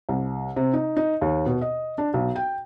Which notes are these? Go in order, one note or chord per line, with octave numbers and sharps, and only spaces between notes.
C2
C3
D#4
D#4
D#2
B2
D#5
D4
B1
G5